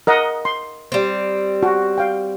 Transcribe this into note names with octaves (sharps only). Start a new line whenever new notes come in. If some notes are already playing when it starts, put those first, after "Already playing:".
A#4 D#5 F#5
C6
G3 C4
F#4
F5 G5